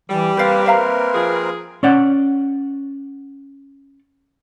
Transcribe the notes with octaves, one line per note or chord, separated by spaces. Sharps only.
E3 G3
A#3 C4 G4 A#4 B4 F5
B4 E5 F5 A#5
F3 G#4
C#4 D5 F#5